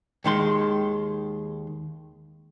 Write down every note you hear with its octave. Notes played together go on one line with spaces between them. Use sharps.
D#2 D#3 G#3 C6